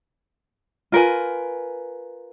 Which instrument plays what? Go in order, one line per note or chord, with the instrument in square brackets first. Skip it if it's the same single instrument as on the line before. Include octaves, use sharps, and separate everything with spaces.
[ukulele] F4 A#4 B4 G#5